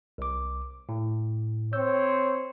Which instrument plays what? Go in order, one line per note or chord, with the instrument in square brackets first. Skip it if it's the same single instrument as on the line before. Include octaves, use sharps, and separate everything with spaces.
[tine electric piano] C2 D6
A2
[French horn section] C4 C#5 [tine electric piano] E6 G6